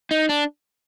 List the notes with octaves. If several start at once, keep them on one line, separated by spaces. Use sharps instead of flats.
D#4
D4